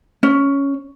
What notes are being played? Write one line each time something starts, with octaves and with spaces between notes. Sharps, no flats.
C#4